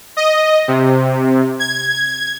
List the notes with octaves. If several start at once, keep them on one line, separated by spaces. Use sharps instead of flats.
D#5
C3
G#6